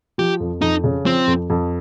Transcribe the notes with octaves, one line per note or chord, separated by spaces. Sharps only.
F3 G4
F2
F2 D#4
C#3
F3 C4
F2
F2